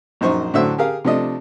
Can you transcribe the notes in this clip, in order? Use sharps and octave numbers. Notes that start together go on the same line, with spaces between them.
A#1 F#2 D#4 C5 C#6
A2 D3 F#3 C5 E5 E6
G4 G#4 A#4 F5
C3 F3 A3 D4 D#5